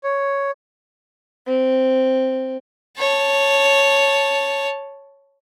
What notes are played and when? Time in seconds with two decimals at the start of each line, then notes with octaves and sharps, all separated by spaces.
0.03 C#5
1.46 C4
2.99 C#5 A5